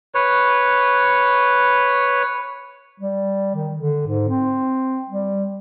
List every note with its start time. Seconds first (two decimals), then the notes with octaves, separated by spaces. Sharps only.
0.15 B4 C#5
3.00 G3
3.55 D#3
3.75 D3
4.07 G#2
4.29 C4
5.10 G3